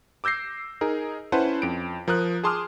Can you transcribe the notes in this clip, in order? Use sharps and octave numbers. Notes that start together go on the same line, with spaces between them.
D6 E6 G6 A#6 C7
D#4 G#4 A#4
C#4 E4 B4 C5 F#5 A5
F2 D7
F3 A#4 D#6 F#6
G#4 A5 C6 D6 D#6 F6